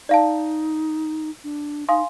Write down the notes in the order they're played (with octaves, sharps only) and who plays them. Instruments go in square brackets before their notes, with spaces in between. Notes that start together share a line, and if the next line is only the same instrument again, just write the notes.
[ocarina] D#4 [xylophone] D5 F5 A5
[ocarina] D4
[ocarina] D#4 [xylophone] F5 G#5 C6 D#6